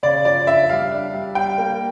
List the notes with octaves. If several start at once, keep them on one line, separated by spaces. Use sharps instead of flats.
C#3 D5
F3 D5
D4 E5
G3 F5
D4
G3
G3 G5
A#3